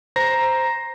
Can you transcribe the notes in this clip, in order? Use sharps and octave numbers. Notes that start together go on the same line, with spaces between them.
C5 A#5 A#6